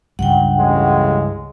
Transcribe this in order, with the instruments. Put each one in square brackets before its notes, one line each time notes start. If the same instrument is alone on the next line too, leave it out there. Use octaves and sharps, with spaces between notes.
[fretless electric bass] C#2 G2 [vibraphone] F#5 G5
[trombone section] A1 C#3 G#3